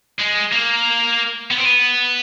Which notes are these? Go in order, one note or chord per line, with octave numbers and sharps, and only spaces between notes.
G#3
A#3
B3
C4
B3